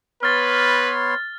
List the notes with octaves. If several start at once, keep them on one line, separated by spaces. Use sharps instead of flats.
B3 B4 C#5 C6 F6 A6